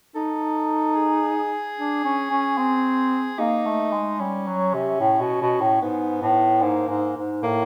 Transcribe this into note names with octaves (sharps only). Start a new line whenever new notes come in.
D#4 A4
G#4
D4
C#4
C#4
C4
A#3 D#4
A3
G#3
G3 C#4
F#3
C3
A2
B2
B2
A2
G#2 B3
A2
G#2 A#3
G#2
G#2
A2 A#3